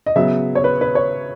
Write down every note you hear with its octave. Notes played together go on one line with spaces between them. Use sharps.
D#5
C#3 F#3 B3 E5
C#5
B4
B4
C#5